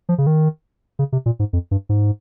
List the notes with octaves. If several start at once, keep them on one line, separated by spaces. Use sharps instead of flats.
F3
C#3
D#3
C#3
C3
A#2
G#2
F2
G2
G#2